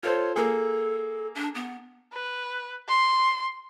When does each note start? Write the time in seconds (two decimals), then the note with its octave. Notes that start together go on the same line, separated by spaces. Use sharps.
0.03 F4 A4 C5 C#5
0.36 A#3 G#4 A4
1.35 D4
1.55 B3
2.13 B4
2.88 C6